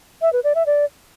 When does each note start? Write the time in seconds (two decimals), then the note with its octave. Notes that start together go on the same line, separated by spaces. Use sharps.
0.22 E5
0.33 B4
0.44 D5
0.55 E5
0.66 D5